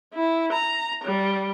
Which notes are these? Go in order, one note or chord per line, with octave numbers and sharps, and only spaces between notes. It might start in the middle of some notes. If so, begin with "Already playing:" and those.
E4
A#5
G3